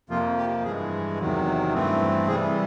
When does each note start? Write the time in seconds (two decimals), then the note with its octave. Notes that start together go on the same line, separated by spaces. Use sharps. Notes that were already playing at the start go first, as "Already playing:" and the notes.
0.10 F2 C3 F3 A#3 F4
0.37 G4
0.64 G2 E3 G#3 G#4
1.19 E2 C3 D#3 F#3
1.74 G2 E3 A3 C4
2.27 C3 E3 G3 G#4